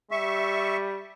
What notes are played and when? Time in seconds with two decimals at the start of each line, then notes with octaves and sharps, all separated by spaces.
0.11 G3 E5 C#6